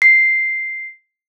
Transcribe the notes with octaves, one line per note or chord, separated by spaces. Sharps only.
C7